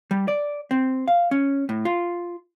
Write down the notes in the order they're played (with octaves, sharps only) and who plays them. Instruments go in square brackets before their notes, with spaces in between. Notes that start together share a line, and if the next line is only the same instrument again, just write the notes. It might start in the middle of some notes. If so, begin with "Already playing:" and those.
[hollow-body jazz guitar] G3
D5
C4
F5
C#4
A2
F4